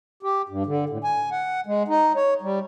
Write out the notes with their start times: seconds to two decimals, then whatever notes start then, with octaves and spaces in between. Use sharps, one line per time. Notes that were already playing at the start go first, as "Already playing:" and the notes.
0.23 G4
0.49 G2
0.66 D3
0.89 A2
1.04 G#5
1.31 F#5
1.66 G#3
1.88 D#4
2.16 C#5
2.42 G3